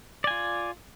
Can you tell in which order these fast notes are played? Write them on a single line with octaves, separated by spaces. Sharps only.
D5 G#5 F4